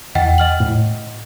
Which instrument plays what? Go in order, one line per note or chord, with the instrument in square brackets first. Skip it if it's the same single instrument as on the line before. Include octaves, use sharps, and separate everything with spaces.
[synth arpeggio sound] E2 [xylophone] D#5 F#5 G5
[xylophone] D#5 F6 F#7
[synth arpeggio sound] A2